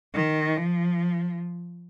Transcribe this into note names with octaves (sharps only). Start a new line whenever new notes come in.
D#3
F3